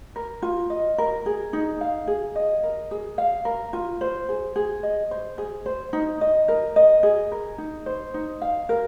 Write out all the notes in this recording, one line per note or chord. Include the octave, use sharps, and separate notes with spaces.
A#4
F4
D#5
A#4
G#4
D#4
F5
G#4
D#5
A#4
G#4
F5
A#4
F4
C5
G#4
G#4
D#5
C5
G#4
C5
D#4
D#5
A#4
D#5
G#4
A#4
D#4
C5
D#4
F5
A#4